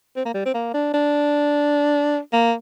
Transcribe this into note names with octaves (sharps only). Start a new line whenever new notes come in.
C4
A#3
G3
C4
A#3
D4
D4
A#3